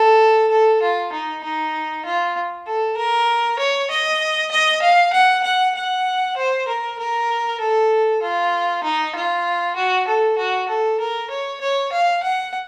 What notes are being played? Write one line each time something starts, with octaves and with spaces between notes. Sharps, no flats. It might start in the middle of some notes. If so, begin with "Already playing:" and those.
Already playing: A4
A4
F4
D#4
D#4
F4
A4
A#4
C#5
D#5
D#5
F5
F#5
F#5
F#5
C5
A#4
A#4
A4
F4
D#4
F4
F#4
A4
F#4
A4
A#4
C#5
C#5
F5
F#5